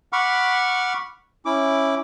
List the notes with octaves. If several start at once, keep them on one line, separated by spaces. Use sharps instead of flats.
F#5 B5 C#6 D6 F6
C#4 E4 D6